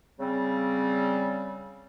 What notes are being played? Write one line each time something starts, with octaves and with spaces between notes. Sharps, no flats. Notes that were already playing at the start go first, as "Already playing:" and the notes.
C#3 G3 C4